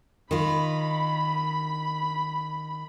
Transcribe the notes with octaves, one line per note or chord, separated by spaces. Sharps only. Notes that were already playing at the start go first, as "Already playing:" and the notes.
D#3 F4 B5